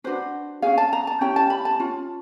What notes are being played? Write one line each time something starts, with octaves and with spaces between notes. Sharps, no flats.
D4 F#4 B4 C5
C#4 F4 G#4 F5
A5
A#5
A5
C#4 E4 G4 G5
A5
B5
A5
C#4 F4